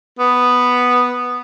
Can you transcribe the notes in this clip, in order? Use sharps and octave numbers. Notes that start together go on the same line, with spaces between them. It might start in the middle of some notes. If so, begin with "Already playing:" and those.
B3